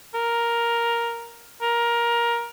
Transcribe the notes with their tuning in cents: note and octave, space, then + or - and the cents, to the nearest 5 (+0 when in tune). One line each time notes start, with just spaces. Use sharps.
A#4 +5
A#4 +15